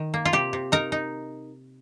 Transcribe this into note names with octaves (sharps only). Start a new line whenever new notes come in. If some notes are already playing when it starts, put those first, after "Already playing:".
Already playing: D#3
A#3
F4
C3 G4
C3
D#4 A#4 A#5
D#4